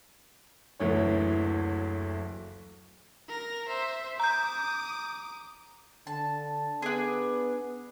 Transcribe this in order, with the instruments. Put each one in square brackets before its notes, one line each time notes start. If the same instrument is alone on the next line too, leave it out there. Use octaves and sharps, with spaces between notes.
[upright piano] F#1 D2 E3 C#5
[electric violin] A#4 A#6
C5 E5
[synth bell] A#5 G6 [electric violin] D6 D#6
[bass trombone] D3 [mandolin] A5
[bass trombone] B3 [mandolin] D4 G#4